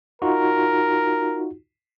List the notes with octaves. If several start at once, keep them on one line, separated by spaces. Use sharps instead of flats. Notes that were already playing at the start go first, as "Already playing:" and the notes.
D#4 F4 F#4 A#4